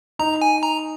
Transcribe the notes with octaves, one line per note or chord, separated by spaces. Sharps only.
D#4 A#5
G#5
A#5